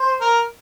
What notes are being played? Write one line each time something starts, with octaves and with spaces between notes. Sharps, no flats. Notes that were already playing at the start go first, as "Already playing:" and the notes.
Already playing: C5
A#4